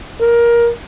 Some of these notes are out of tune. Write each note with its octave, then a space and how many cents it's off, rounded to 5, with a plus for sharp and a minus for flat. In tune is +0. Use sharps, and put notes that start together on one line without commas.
A#4 +15